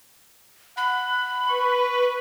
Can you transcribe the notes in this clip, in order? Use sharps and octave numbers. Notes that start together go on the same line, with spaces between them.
F#5 B5
B4 C#6